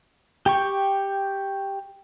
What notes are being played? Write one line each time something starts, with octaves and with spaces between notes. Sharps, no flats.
G4 G5 C#6